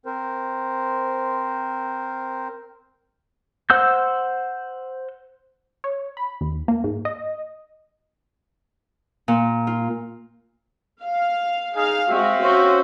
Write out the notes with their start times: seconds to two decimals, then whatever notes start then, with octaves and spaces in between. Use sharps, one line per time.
0.06 C4 A#4 C5
3.70 C5 F#5 E6 G6
5.84 C#5
6.17 B5
6.41 D#2
6.68 A#3
6.84 G#2
7.05 D#5
9.28 A#2
9.67 F4
11.02 F5
11.76 D#4 G#4 F5
12.08 G#3 C4 F#4 E5 F5
12.42 C#4 F#4 C5